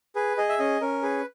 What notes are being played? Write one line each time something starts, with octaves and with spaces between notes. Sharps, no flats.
G#4 B4
G#4 D#5
E5
C#4 D#5
C#4 A#4
G#4 B4